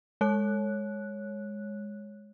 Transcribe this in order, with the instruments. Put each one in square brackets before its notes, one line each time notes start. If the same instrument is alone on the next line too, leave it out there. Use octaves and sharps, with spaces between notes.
[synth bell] G#3 C#5 F#6